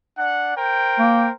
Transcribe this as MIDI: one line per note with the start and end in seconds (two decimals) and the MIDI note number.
0.18 0.56 62
0.18 0.56 74
0.18 0.56 78
0.57 1.32 70
0.57 1.32 72
0.57 1.32 79
0.99 1.28 58